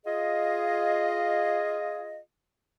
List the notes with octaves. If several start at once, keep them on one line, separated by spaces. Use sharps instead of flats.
F4 G#4 D#5